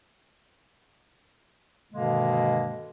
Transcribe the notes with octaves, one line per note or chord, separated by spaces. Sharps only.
G2 B2 D3 D#3 G#3 A#3